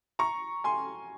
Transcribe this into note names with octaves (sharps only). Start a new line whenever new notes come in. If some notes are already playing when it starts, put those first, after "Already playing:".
A#5 C#6
G#5 C6